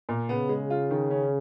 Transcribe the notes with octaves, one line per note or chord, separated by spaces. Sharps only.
A#2
C#3 B3
G#3
F4
D#3
C#4